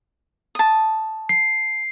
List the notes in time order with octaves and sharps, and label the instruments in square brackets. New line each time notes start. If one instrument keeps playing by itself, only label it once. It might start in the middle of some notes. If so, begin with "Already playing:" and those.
[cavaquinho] A5 D#6
[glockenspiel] C7